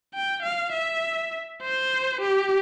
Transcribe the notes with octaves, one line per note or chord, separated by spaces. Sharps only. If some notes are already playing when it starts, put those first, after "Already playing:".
G5
F5
E5
C5
G4